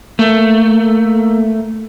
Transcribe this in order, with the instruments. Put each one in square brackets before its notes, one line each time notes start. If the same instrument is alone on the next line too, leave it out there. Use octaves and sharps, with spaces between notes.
[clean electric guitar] A3 [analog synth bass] A#3